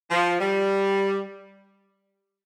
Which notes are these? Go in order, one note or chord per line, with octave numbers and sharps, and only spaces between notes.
F3
G3